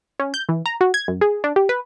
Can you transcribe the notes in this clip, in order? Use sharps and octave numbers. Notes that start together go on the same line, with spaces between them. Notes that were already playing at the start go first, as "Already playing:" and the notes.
C#4
G6
E3
A#5
F#4
G#6
F#2
G#4
D4
G4
B4